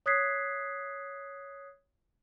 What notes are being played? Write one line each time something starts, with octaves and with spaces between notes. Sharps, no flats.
C#5 D#6 F#6 G#6 B6 C7